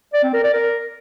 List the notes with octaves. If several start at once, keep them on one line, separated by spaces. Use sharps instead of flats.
D5
C4
A#4
D5
A#4